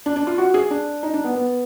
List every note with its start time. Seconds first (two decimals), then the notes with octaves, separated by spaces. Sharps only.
0.06 D4
0.16 D4
0.27 F4
0.38 F#4
0.54 G#4
0.71 D4
1.03 D#4
1.14 D4
1.24 B3
1.36 B3